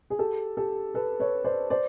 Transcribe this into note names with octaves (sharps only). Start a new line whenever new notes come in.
G#4
G4 A4
G4 A4
A4 B4
B4 C#5
C5 D5
C5 D5